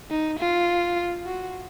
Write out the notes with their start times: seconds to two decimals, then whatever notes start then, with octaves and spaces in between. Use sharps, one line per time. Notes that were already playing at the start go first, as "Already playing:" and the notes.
0.11 D#4
0.39 F4
1.26 F#4